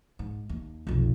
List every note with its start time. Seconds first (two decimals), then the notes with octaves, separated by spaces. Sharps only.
0.19 G#2
0.49 D#2
0.87 F1 B1